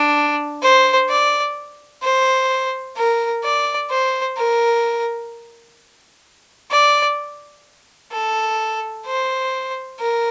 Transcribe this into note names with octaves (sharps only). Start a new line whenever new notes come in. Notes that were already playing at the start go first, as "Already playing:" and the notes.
Already playing: D4
C5
D5
C5
A#4
D5
C5
A#4
D5
A4
C5
A#4